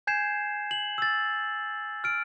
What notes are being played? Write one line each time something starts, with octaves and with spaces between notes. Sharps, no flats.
G#5 G6 G#6 C7 E7
F#7
E6 A6
F6 D7